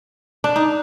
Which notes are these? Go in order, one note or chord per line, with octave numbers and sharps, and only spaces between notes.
D4
D#4